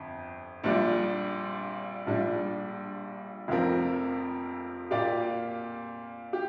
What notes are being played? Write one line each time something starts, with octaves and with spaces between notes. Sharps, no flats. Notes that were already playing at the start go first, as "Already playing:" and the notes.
Already playing: G1 F2
A#1 A#2 G3 D4
A#1 A#2 G3 D4
F1 F2 F3 C4 A#4
A#2 A#3 G4 D5 F5
G4